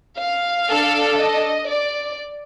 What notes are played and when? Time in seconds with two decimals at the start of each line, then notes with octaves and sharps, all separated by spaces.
0.19 F5
0.69 D4 A4
1.19 D#5
1.70 D5